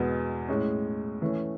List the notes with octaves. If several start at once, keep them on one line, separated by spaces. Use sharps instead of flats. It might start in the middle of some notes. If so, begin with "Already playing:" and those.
Already playing: E2 B2 G#3 B3
A2 G#3 C#4
E3 A3 C#4